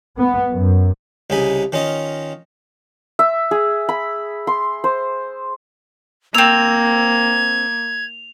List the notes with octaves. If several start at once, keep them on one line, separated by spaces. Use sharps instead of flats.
B3
F#2
C2 C#3 D#4 G#5 B5
D#3 C#4 F4 D#5
E5
G#4
B5
C6
C5
A#3 C4 E6 G#6 F7